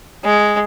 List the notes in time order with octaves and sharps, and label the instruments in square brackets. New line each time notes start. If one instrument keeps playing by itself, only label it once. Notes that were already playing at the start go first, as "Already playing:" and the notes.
[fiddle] G#3